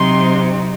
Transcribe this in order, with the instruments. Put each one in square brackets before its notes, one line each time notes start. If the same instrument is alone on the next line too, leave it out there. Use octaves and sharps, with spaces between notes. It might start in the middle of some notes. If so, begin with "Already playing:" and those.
Already playing: [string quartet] C3 F#3 C4 D#4 C6